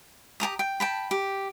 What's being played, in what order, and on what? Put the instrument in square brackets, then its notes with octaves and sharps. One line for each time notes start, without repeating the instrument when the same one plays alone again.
[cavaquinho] G4 A5 A#5 D#6
G5
G5 A5 B5
G4